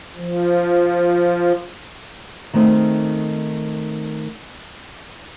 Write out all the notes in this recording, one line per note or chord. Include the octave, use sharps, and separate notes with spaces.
F3
D#3 A3 C4 D#4